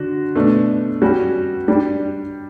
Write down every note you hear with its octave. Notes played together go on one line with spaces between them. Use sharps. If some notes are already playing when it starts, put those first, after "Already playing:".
Already playing: D3 D4 F#4
B2 A3 D4 A4
G3 C#4 F#4
G3 D4 G4